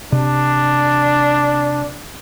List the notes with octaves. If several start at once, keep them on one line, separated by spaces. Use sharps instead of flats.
C3 D4